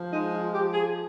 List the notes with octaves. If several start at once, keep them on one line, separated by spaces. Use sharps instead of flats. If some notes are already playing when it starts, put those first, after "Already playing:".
Already playing: F3
G#3 D#4
F4
F3 G4
G#4